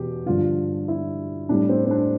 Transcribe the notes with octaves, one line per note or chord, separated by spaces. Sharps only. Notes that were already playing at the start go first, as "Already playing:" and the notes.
Already playing: E2 B2 G4
G2 D3 F3 F4
E4
A2 G3 D4
C4
C4
D4